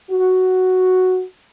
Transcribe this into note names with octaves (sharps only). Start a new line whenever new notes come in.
F#4